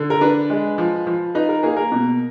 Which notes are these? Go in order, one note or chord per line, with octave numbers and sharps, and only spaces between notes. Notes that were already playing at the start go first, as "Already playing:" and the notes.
Already playing: D3
A#4
D4 B4
G#3
F3
F3
D#4 B4
A#4
A#3 G#4
A#4
B2